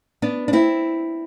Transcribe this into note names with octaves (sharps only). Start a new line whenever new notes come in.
B3 D4
D4
C4 E4